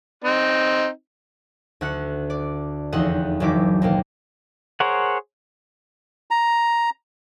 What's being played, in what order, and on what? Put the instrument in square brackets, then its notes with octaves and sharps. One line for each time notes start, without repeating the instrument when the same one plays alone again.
[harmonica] C4 D#4
[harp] D2 F#5 F#6 C#7
D5
F1 E2 D#4 D#5 F#5
F#1 D2 E3 F#3 G4 D6
D#2 B2 A#3
[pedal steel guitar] G#4 A#4 C5 C#5 F#5
[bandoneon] A#5